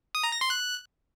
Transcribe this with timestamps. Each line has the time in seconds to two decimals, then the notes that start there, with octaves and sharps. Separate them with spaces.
0.15 D#6
0.23 A#5
0.32 A#6
0.41 C6
0.50 F#6